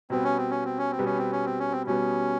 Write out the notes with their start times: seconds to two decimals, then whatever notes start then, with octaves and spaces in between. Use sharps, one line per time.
0.10 B2 G3 B3 C4
0.24 C#4
0.37 C4
0.51 C#4
0.65 C4
0.78 C#4
0.91 C4
0.99 B2 G3 B3
1.05 C#4
1.18 C4
1.32 C#4
1.46 C4
1.59 C#4
1.72 C4
1.87 B2 G3 B3 C#4